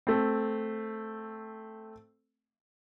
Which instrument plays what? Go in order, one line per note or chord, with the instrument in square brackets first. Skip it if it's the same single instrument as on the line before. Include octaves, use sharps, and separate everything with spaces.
[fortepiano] A3 C4